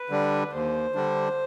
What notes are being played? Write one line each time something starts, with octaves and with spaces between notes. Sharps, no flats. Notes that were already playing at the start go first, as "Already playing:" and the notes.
Already playing: B4
D3 G3 D4
D#2 C5
D3 G3 D4